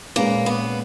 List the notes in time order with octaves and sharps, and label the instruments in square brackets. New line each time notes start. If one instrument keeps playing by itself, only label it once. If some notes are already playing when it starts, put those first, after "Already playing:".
[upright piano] A#2 G#3 C#4 G#4 B4 [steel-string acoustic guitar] A#3
[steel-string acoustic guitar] B3